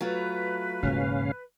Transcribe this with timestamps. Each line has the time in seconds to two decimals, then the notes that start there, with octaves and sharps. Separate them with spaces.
0.01 F#3 A3 F4 B4
0.83 E1 G#2 C#3 A#3 C#4 F5